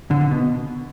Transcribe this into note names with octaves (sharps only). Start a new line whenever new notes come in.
D3
D3
B2